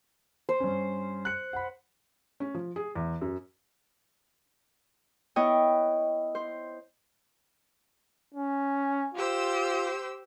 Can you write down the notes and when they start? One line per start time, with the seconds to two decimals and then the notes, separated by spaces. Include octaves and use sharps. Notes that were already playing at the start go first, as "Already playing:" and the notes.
0.49 C5
0.60 G2 C#4
1.25 F#6 C#7
1.53 F#5 B5
2.40 C#4
2.55 F3
2.76 G#4
2.95 E2
3.21 F#2
5.36 B3 E4 C#5 D#5 G5
6.35 C5
8.35 C#4
9.14 F4 G4 C5 E6